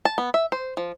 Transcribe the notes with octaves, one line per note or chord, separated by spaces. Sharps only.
A5
B3
E5
C5
F3